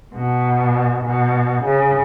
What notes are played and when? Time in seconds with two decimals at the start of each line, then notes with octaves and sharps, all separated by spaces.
0.14 B2
1.04 B2
1.64 C#3